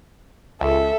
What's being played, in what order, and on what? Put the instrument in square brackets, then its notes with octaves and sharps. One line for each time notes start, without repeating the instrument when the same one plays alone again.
[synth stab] C#2 [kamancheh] A4 E5